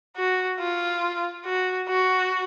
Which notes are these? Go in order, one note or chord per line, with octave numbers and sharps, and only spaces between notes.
F#4
F4
F#4
F#4